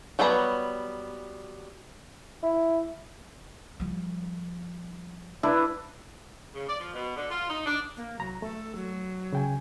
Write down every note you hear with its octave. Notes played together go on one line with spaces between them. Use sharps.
F#3 G3 B3 C#5 A#5
E4
F3 G3
D4 E4 B4
C#3
D5
F3
B2
D3
F4
D#4
D4
A#3
C2 F#3 A#5
A3 A4
F#3
C#3 G5 G#5